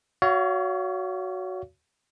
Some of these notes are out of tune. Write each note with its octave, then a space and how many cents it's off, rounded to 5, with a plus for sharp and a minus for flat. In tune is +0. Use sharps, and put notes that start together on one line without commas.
F#4 +0 C#5 +35 F5 -30